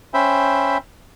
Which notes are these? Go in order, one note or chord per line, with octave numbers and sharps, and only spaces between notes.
C#4 C5 E5 G5 B5